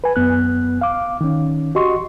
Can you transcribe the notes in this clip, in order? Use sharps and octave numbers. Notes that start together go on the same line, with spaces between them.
B4 G#5
F#2 B3 F#6
F5 D6
D#3 C#4
F#4 G4 D#5 C6 C#6